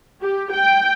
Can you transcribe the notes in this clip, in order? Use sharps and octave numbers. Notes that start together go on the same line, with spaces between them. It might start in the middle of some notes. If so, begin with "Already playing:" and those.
G4
G5